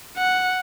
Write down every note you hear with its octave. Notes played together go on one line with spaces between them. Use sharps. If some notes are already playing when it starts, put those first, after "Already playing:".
F#5